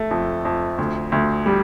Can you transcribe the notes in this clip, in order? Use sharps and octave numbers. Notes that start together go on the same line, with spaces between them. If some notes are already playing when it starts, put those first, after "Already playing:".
Already playing: A3
F2
F2
D2
D2
G3